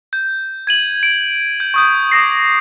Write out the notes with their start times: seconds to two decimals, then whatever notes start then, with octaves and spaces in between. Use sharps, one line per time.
0.13 G6
0.67 G#6 D#7 F#7
1.03 D7
1.60 G6
1.74 C#6 D#6 G6
2.12 D6 D#6 A#6 C7